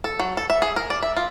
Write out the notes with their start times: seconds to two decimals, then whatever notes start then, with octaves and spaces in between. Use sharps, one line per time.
0.04 A4
0.19 F#3
0.37 A4
0.50 E5
0.62 G#4
0.76 A#4
0.90 D5
1.03 E5
1.17 F4